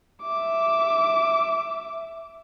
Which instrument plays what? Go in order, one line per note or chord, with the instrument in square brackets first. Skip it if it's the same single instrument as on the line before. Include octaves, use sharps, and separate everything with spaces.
[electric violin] E5 D6